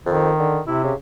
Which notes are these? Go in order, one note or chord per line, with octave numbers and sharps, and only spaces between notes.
F2 D#3
D3
C3 E4
C#3